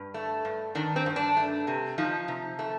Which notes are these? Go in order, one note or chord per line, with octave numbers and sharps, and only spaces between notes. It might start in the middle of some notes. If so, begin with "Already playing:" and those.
Already playing: G2
A3
G2
D#3 D4
C4
G2
D4
A3
C3
F3 D#4
C3
A3